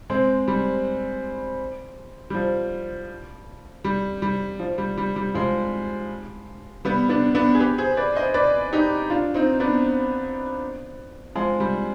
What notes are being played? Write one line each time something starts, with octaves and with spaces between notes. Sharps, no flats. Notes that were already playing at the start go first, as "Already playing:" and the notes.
G#3 C4
G3
G3
F3
G3
G3
F3
G3
G3
G3
F3 G#3
G3 B3
B3 D4
B3 D4
G#4
G4 B4
G#4 C5
B4 D5
C5 D#5
B4 D5
D#4 G4
D4 F4
C4 D#4
B3 D4
F3 G#3
G3